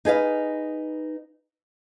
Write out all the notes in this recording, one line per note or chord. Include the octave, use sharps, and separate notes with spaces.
D#4 G#4 B4 F5